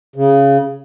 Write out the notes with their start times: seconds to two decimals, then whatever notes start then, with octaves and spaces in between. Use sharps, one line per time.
0.16 C#3